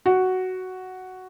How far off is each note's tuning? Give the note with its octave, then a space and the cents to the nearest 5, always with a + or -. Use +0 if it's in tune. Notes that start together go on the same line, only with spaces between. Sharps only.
F#4 +5